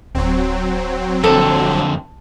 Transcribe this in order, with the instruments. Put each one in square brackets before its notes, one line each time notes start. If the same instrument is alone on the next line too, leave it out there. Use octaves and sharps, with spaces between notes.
[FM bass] D1 [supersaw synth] F#3 C4
[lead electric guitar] F2 D3 [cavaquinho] A4